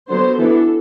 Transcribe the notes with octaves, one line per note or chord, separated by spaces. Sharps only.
D3 F#3 B3 C5
E3 B3 D4 A4